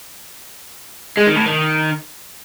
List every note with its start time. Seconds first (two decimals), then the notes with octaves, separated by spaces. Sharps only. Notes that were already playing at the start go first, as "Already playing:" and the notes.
1.17 G#3
1.27 D#3
1.36 A2
1.46 D#3